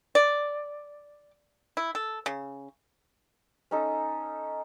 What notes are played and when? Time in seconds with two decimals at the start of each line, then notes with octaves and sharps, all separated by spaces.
0.15 D5
1.77 E4
1.95 A4
2.26 C#3
3.71 C#4 D#4 A4